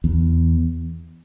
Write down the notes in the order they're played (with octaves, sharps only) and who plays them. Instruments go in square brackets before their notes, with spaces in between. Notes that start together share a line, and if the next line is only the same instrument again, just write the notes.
[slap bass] E2